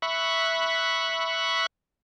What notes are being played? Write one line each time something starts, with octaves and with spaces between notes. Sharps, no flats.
E5 B5 C#6 F#6